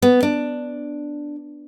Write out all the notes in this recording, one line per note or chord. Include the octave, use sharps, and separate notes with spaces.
B3
D4